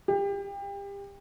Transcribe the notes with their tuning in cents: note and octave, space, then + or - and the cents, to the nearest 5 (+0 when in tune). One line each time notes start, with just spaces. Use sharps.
G4 +30